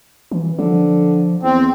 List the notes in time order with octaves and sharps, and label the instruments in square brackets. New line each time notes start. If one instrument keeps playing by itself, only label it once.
[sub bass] E3
[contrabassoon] D3 [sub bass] F3
[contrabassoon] E2 [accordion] C4